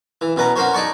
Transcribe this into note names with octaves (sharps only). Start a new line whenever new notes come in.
E3
B2 C#4 B4 A#5
C#4 F#4 A#4 C5 C#5
D#4 G#4 D5 A5 C#6